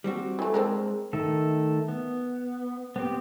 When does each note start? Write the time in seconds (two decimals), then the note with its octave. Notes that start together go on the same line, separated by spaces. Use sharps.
0.04 G3 C4 F#4
0.39 E3 A3
0.54 G#3 C4 D4 A#4
1.13 D#3 A3 A4
1.88 B3
2.96 B3 C4 G4